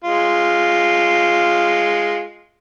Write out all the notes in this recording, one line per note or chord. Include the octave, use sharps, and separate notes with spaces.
G#3 F4